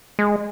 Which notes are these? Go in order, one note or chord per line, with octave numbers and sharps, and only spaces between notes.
G#3